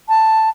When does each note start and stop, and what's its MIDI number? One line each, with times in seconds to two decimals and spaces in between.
0.09 0.49 81